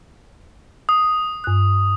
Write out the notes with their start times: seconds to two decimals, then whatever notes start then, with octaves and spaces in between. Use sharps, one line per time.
0.89 D#6
1.44 G2 F#6